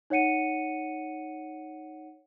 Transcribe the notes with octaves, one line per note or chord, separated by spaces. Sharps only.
D#4 C#5 F#5 C#7 D#7